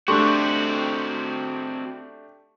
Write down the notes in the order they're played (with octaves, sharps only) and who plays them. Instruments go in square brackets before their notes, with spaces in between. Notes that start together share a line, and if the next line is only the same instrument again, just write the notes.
[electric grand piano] A3 D4 G4 [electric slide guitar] C4 F#4 [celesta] A4 C6 C#6